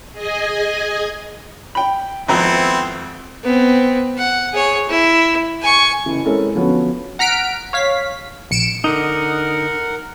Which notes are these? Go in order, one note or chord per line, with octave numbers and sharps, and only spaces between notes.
G#4 D#5 G#5
G5 B5
G#1 F2 B3 C4 E4 A#5
B3 C4
F#5
G#4 C#5
E4
G#5 C#6
F#1 E3
G#3 C4 C#4 E4 A4 A#4
D3 F3 B3 C#4 F#4
F#5 A#5 F6 B6 D7
C#5 F5 B6
A#1 C#7 D7 E7
D3 D#4 A#4 F#5